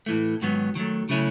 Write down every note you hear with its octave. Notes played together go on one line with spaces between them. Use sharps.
A2 E3 A3
G#2 D#3 F#3 B3
D#3 F#3 A3
C#3 F#3 A3 C#4 E4